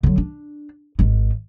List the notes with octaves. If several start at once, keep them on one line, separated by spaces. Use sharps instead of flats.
D3 F#3
D4
G#1 D#3